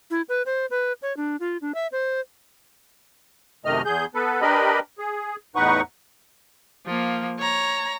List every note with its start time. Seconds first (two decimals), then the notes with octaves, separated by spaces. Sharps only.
0.11 E4
0.29 B4
0.46 C5
0.70 B4
1.02 C#5
1.17 D4
1.40 F4
1.62 D4
1.74 E5
1.92 C5
3.65 F#2 C3 D#3 A3 D#5 F6
3.85 E2 G#4 G6
4.15 B3 A4 B4
4.42 D4 G4 A#4 B4 D#5 B5
4.99 G#4
5.56 E2 A2 D#4 B4 F#5 C#6
6.86 F3 A#3
7.39 C#5 A#5